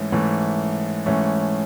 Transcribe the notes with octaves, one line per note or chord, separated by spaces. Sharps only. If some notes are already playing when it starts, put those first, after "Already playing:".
Already playing: G#2 E3 A3 C#4
G#2 E3 A3 C#4
G#2 E3 A3 C#4